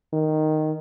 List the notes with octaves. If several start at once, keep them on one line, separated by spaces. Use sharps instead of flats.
D#3